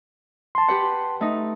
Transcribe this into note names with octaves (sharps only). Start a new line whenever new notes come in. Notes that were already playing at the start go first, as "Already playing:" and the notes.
A5 C6
G4 B4 F#5
A3 D#4